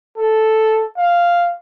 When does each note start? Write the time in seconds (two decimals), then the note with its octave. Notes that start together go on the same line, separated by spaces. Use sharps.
0.18 A4
0.97 F5